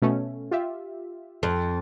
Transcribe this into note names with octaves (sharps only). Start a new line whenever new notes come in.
B2 A3 C#4
F4 G4 E5
F2